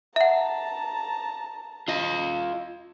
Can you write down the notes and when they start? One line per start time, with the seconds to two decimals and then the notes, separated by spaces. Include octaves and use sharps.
0.16 E5 F#5 A5 A#5
1.88 F4 D#5